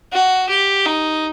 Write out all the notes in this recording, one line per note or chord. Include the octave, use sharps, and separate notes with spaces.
F#4
G4
D#4